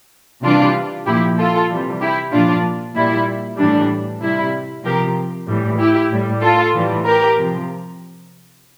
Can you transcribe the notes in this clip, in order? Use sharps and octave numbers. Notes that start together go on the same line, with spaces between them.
C3 E3 G3 D4 F4
A#2 F3 E4 G4
F4 A4
C3 E3 G3
E4 G4
A#2 F3 D4 F4
A#2 G3 E4
A2 E3 G3 D4
C3 G3 E4
C3 F3 G4 A#4
A2 E3 G3
E4 G4
A2 G3
F4 A4
A2 E3 G3
G4 A#4
C3 F3